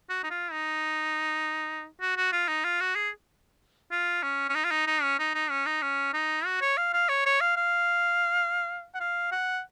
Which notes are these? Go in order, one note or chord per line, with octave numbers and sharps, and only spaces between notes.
F#4
D#4
F4
D#4
F#4
F#4
F4
D#4
F4
F#4
G#4
F4
C#4
C#4
D#4
F4
D#4
D#4
C#4
D#4
D#4
C#4
D#4
C#4
D#4
F#4
C#5
F5
F5
C#5
C#5
F5
F5
F#5
F5
F#5